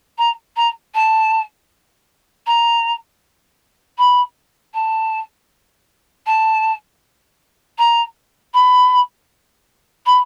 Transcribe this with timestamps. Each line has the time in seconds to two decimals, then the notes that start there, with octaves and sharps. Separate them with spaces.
0.18 A#5
0.56 A#5
0.94 A5
2.46 A#5
3.98 B5
4.74 A5
6.26 A5
7.78 A#5
8.54 B5
10.06 B5